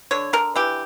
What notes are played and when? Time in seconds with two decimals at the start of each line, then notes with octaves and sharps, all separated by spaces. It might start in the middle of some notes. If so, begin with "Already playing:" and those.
0.11 D3 C#5
0.33 D3 A#4
0.56 E3 G4